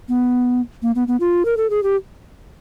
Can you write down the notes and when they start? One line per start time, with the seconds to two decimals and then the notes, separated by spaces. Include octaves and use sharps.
0.09 B3
0.83 A#3
0.95 B3
1.08 B3
1.20 F4
1.45 A#4
1.57 A4
1.70 G#4
1.83 G4